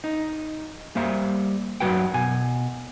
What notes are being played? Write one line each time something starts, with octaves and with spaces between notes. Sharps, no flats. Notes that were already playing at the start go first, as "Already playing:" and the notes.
D#4
G3 A#3 C5 E5
F#2 E3 F#3 F#4 B4 G5
B2 G#5